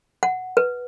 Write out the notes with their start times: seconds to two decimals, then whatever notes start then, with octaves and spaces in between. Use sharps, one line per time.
0.23 F#5
0.57 B4